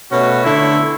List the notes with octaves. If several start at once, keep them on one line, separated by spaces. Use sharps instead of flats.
B2 A3 C#4 F#4
D3 A3 E4